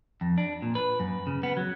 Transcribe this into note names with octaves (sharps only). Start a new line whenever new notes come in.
F2
D4
A#2
B4
F#2
C#3
B3
F#3